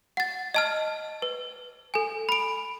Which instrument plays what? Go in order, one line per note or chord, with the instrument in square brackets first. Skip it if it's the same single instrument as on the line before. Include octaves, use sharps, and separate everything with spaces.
[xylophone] F#5 A6
D#5 A5 F6
B4
A4 G#5
B5 D7